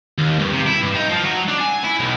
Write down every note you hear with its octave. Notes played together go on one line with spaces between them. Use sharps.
D#2
G2
C3
E4
G2
D#4
F3
F#3
D4
G#5
E4
B1